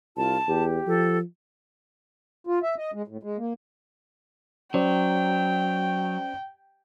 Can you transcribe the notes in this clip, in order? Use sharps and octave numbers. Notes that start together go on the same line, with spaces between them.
C2 F4 A5
E2 G4
F3 A4
F4
E5
D#5
G#3
A2
G#3
A#3
F#3 C#4 C5 D5 G5